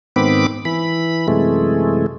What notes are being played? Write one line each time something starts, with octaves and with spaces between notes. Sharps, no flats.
G#2 D#3 B3 C4 B5 D6
E3 B5
F#2 C3 E3 G#3 A3